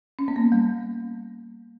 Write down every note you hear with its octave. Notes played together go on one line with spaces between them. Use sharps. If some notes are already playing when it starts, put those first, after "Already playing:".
C#4
B3
A#3
G3